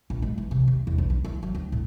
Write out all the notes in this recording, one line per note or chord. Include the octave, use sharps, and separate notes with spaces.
A#1
G#3
E3
C3
D#2
E2
B1
D2
E3
F#3
D2
A2